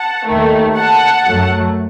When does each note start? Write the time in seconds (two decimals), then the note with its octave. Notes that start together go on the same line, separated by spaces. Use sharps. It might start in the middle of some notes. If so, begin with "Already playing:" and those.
Already playing: F#5 A5
0.27 D#2 D#3 A3
0.77 F#5 A5
1.26 F#2 F#3 A3